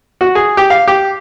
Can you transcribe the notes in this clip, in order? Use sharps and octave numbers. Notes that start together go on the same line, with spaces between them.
F#4
G#4
G4
F5
G4